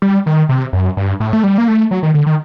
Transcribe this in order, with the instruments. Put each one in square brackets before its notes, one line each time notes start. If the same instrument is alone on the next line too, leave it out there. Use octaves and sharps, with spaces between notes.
[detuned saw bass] G3
D#3
C3
F#2
G2
A2
A3
G3
A#3
A3
F#3
D#3
D3
D#3